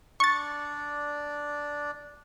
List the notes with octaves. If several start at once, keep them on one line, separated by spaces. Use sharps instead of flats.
D4 D5 C#6 A6